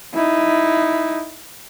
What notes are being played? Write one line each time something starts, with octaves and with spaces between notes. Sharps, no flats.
D#4 E4